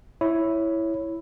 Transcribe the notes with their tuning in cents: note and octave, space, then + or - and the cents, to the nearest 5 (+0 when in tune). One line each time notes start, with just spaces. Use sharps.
E4 +0 C#5 +0